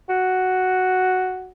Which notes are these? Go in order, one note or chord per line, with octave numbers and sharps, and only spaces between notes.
F#4